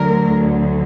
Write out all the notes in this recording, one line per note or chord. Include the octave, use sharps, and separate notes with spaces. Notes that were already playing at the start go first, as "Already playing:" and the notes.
Already playing: D2 D3 F#3 A#4